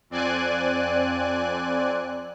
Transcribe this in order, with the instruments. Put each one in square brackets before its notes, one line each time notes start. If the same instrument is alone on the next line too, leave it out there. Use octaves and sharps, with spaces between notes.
[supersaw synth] F2 C4 D5 G#5 F#6